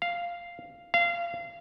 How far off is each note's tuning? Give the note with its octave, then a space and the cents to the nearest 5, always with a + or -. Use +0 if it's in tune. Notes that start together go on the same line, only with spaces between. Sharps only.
F5 -5
F5 -25